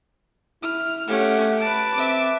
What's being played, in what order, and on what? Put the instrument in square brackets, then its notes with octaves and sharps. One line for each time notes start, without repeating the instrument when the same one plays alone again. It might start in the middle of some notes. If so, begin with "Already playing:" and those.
[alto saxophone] E4 [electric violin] F6
[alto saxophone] A3 [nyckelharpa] C#4 [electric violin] G4 F#5
[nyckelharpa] B4 A5 [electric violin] D7
[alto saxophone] C4 [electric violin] E5 D6